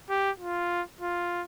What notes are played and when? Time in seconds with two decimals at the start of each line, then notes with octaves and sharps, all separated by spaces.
0.10 G4
0.40 F4
1.01 F4